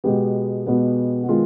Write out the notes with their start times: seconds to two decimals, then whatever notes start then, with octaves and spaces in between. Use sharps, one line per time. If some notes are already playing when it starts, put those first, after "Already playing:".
0.04 B2 G#3 B3 G4
0.67 B2 G#3 B3
1.23 F#4
1.29 D#3 G#3 B3 F4